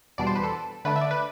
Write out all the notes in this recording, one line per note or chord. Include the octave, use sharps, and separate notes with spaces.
E2 B2 G3 D4 D5
C5
B4
A4
D3 A3 D4 B4
E5
D5
B4